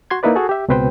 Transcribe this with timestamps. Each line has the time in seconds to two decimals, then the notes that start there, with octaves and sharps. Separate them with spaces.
0.10 F#4 C6 G#6
0.23 A#3 D#4 E4 B4 D5
0.35 F#4 G#4 A4
0.49 G4 E5
0.68 C#2 B2 C4 B4 C5 G5